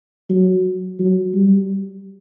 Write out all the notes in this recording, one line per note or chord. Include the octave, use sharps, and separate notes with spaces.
F#3
F#3
G3